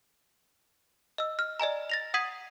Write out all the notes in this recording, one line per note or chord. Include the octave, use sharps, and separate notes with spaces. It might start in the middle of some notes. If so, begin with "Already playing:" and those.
D#5 E6
F6
D5 D#5 G#5 A#5
A6 A#6 F7
F#5 D#6 G#6 B6 D#7 F#7